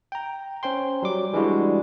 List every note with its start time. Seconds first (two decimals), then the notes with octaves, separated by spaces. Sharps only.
0.12 G5 A#5
0.63 C#4 C5 G5 C6
1.03 F#3 G3 D6
1.33 E3 G3 G#3 D4 E4 F#4